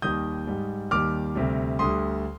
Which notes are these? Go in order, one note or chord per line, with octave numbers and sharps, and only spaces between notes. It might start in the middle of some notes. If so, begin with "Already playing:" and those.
D#2 D#3 G3 D#6 G6
G#2 G3
D#2 D#3 G3 D6 F6
D2 C3 G3
D2 D3 G3 C6 D#6